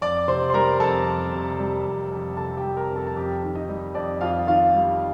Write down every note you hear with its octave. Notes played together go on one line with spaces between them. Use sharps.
F2 D5 D6
C3 C5 C6
C6
G3 A#4 A#5
F2 A4 A5
F2
C3
G3
F2
F2
C3 A4 A5
G4 G5
G3
A#4 A#5
F2
A4 A5
A5
F2 G4 G5
D#3
D#4 D#5
G3
F2 D5
F2 F4 F5
D#3 F4 F5
G3